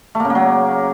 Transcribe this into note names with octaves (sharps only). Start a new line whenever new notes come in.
A3
A#3
C#3
A#3
F#3